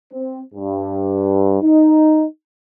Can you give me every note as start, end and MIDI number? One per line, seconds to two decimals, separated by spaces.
0.12 0.39 60
0.54 1.59 43
1.62 2.24 63